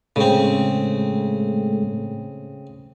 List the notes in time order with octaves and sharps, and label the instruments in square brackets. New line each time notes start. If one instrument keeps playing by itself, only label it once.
[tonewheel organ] A2 G#3 A3 [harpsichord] C#3 C4